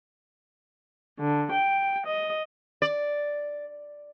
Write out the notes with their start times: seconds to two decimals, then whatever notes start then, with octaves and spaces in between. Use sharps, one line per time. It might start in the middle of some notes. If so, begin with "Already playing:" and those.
1.17 D3
1.50 G5
2.05 D#5
2.82 D5